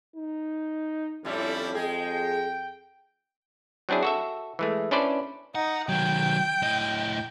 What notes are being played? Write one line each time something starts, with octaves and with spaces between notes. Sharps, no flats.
D#4
F2 A2 G3 C#4 D4 E4
G#3 G#4 G5
F#3 C4 D4 E4 G#4
F#4 A4 E5
E3 G#3 A3
C#4 D4 E4 B4 C5 D5
D#4 F#5
D#3 F#3 G5
A2 D#5